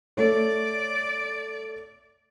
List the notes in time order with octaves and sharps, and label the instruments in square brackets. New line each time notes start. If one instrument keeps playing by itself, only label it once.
[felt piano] A3 C#5 [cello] D5